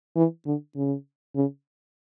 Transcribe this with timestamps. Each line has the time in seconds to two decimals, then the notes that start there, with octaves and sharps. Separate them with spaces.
0.16 E3
0.46 D3
0.75 C#3
1.36 C#3